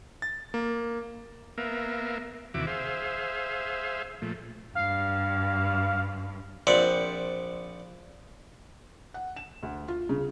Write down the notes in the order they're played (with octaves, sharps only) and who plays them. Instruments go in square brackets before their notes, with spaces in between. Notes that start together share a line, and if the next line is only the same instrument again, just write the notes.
[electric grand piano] A6
A#3
[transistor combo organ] A#3 B3 A#4 E5 F5
D#2 C3 E3 F#4 E5 D6
G#4 C5 E5 F5
A#2 F3 A3
[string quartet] G2 [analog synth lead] F5
[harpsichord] A#1 C4 D5 E5 F#5
[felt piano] F#5
E7
D2
F4
C#3